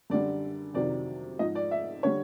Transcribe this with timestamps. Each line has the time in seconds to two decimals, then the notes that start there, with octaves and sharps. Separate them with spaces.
0.10 F#2 D3 G3 D5
0.74 F2 C3 D#3 F#3 D5
1.39 G#2 F3 D#5
1.55 D5
1.71 E5
2.03 D3 G3 C#5